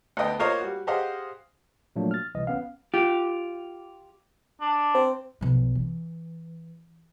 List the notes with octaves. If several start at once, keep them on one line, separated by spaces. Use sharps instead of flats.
D2 B3 D#5 G5
A#3 F4 C5 C#5 D#5 A#5
G3 F#4
G4 G#4 C5 D#5 F5 F#5
A#2 F3 F#3 A3 A#3 D4
F6 A6
C2 E3 D#5
A1 B3 C#4 F5
F4 G4
D4
C4
B1 F3
E3